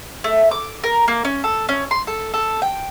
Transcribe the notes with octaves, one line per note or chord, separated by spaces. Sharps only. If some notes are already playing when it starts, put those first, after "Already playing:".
A3
D6
A#4
A#3
C#4
A4
C#4
C6
A4
A4
G5